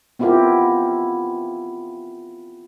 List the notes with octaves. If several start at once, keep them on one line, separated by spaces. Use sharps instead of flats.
B3 C4 E4 F4 G4 A#4